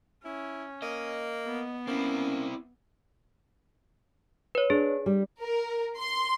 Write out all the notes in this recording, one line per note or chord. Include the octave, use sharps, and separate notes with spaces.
C#4 E4
A#3 D#5
B3
A#3 C4 C#4 E4
B4 C#5
D4 G#4
G3
A#4
C6